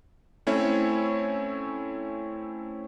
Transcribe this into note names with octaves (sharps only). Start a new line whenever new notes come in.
A3 C4 C#4 E4 C#5